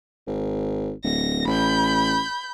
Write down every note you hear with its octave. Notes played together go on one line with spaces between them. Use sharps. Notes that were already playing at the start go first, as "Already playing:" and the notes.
G#1
D1 A#6
A1 B5 G6